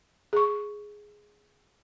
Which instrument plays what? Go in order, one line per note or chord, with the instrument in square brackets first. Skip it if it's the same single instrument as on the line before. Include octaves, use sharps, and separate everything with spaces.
[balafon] G#4 C#6